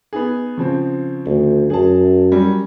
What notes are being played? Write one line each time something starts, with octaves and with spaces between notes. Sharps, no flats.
B3 D#4 G#4
C#3 F3 C4
D2
F#2 G#4 A5
F#3 G3 C#4